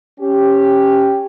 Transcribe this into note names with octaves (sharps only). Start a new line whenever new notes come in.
C#4 G4